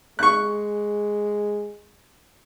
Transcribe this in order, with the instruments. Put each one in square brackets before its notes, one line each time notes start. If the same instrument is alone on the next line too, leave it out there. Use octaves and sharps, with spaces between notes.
[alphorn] G#3 [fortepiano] C#6 F#6